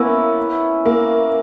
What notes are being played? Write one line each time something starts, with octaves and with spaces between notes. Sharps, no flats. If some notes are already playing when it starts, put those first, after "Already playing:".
Already playing: A#3 B3 C#4 E4
A#3